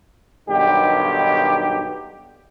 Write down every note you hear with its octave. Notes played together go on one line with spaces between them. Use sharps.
B1 G2 D#3 G4